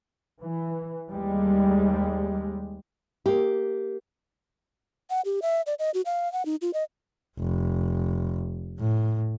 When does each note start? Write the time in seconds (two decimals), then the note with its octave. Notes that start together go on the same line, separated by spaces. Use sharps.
0.41 E3
1.09 D#2 G3 G#3
3.26 A#3 G4
5.10 F#5
5.25 G4
5.42 E5
5.67 D5
5.79 D#5
5.94 F#4
6.06 F5
6.33 F#5
6.45 D#4
6.62 F4
6.74 D#5
7.39 F1
8.79 A2